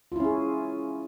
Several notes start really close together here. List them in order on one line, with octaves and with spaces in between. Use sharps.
F4 E4 C#4 G#4